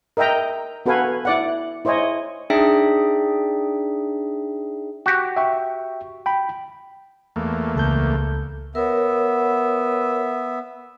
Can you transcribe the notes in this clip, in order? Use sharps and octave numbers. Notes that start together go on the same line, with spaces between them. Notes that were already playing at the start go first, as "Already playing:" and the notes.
A#4 D#5 E5 G5 A#5
B3 F#4 A4 B4 F5 G#5
E4 D5 F#5
E4 C5 C#5 D#5 G#5
D4 D#4 G#4 D5 E5 G5
F#4 G4
E5 G5 C#6
G5 B5
E2 A3 A#3
C#2 A4 G6
B3 A#4 C#5 E5